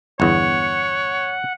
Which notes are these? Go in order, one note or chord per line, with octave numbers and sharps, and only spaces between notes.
G1 E2 C#5 F#5